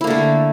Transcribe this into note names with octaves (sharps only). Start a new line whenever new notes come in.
D3 A3 A#3 E4